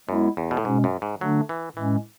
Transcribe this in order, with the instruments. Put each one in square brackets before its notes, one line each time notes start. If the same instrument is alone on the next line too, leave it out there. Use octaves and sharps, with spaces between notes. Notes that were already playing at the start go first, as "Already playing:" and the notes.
[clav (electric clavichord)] F#2 [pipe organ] G#3 B3 E4
[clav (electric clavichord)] E2
B2
A2
[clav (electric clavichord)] G#2 [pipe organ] B2 G#3 C#4
[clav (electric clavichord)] F#2
G#2
[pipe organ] D3 A3 D4 [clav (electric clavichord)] F#3
[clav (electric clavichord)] E3
[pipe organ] A2 G#3 C#4 [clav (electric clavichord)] E3